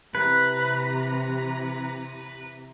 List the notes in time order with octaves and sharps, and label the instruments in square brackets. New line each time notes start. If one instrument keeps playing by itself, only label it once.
[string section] C3 E3 A#5 [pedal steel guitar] B4